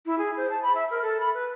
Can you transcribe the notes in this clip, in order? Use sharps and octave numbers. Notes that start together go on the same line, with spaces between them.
E4
G#4
C5
A5
B5
E5
A#4
A4
B5
B4